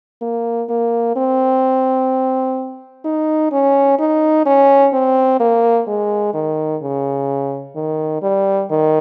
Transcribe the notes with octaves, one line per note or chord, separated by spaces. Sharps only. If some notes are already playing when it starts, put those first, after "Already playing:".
A#3
A#3
C4
D#4
C#4
D#4
C#4
C4
A#3
G#3
D#3
C#3
D#3
G3
D#3